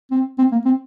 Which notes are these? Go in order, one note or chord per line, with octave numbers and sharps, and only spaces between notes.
C4
C4
A#3
C4